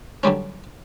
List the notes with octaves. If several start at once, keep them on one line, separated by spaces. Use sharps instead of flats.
D3 F#3 G3 C#4